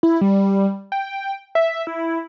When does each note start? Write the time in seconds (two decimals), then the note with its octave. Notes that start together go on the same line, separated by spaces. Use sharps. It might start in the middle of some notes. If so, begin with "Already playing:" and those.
0.03 E4
0.21 G3
0.92 G5
1.55 E5
1.87 E4